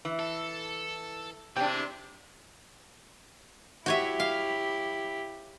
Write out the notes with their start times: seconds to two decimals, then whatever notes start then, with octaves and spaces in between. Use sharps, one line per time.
0.05 E3
0.19 A4
1.56 C3 E3 D4 G#4 G5
3.86 E4 F#4 G4 C#5 E5
4.20 F5